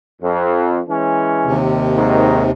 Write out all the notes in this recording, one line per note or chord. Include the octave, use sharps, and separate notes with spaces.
F2
E3 G#3 C#4
D#2 C3
G#2 D#3 D#4